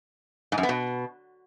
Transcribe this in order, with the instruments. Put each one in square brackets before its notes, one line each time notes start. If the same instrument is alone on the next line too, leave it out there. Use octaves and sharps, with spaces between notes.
[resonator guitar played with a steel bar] G#2
F#2
B3
B2